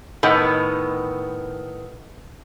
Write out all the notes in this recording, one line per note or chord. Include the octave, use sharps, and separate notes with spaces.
A2 D#3 B3